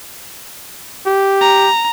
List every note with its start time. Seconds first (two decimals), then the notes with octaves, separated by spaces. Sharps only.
1.06 G4
1.41 A#5